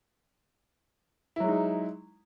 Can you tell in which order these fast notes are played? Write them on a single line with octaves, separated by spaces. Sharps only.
E4 F#3 G#3 D#4